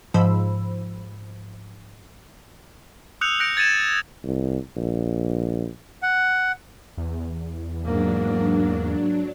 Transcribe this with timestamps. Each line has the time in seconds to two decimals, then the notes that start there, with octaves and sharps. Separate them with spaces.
0.14 G#2 F3 C5 B5 E6
3.21 D#6 E6 F#6 G6 C#7 F7
3.40 F#6 G6 A#6 C#7 D7
3.57 G#6 A6 C#7 D#7 E7
4.24 C2
4.76 A#1
6.03 F#5
6.97 E2
7.84 G#2 F#3 A#3 D4